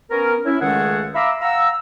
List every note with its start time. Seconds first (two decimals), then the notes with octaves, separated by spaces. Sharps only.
0.11 B3 C#4 A#4
0.46 C#4 E4
0.61 C#2 D#3 G#3 A3 G#4 F#5
1.15 E5 F5 A#5 B5 D6 E6
1.40 F5 F#5 A#5 E6